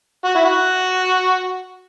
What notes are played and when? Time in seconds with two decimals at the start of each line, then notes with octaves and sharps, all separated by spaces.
0.24 F#4
0.35 E4
0.45 F#4